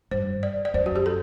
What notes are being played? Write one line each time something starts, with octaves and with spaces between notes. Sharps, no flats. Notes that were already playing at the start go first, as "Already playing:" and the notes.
G2 C5
D5
D5
F#2 C5
F#4
G4
A4